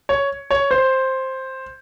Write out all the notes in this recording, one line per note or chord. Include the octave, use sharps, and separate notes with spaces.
C#5
C#5
C5